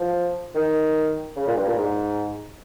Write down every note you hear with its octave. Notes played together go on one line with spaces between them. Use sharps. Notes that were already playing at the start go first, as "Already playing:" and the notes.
Already playing: F3
D#3
C#3
A#2
G2
A#2
G#2